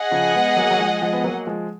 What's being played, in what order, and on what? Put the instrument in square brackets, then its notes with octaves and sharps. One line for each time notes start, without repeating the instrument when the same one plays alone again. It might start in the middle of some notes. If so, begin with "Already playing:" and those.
Already playing: [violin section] G#4 D#5 F#5
[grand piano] C#3 F3
G#3 B3
F#3 A#3
F#3
F3 G#3
F3 G#3
B3
F#3 A#3
F3 G#3